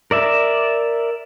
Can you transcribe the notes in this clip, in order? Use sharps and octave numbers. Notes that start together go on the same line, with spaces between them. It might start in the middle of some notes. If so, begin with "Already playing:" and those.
A#4 D5 E5